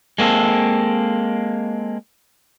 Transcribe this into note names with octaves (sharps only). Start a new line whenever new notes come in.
G#3 A#3 C4 A4